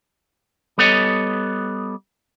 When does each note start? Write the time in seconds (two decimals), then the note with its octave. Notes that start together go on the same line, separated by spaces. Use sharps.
0.78 G3 B3 A4 C#5 D#5